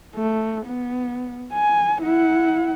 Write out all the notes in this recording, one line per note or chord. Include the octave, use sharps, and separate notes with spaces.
A3
B3
G#5
E4 F#5